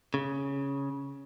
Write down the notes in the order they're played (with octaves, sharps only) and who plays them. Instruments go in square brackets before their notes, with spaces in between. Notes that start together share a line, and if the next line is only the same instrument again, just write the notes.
[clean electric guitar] C#3